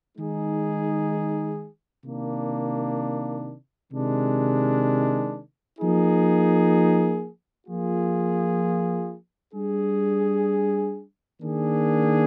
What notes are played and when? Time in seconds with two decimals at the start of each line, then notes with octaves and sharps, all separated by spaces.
0.17 D#3 G#3 D#4 G#4
2.04 C3 D#3 A#3 D4
3.92 C3 D#3 G#3 D4
5.79 F3 A#3 D#4 G#4
7.66 F3 A#3 F4 G#4
9.54 G3 D4 G#4
11.41 D#3 A#3 D4 G#4